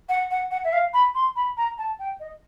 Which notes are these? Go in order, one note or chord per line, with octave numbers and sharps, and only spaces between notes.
F#5
F#5
F#5
E5
F5
B5
C6
B5
A#5
A5
G5
D#5